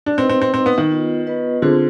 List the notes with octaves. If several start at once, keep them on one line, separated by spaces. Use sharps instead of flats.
D4
C4 D#4 B4 D#5
C4
C4
C4 D#4 B4 D#5
B3
D#3
B3 F4 B4 D#5
B3 F4 B4 D#5
D3 C4 F4 G#4 C5